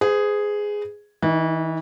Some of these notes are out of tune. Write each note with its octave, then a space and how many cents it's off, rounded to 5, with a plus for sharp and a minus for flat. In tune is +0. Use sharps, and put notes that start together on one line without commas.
G#4 +0 C5 -45
E3 -35 D#4 +0